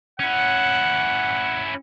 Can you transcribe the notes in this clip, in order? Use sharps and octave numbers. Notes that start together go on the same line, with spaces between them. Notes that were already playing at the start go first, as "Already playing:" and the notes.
C#4 E4 F#5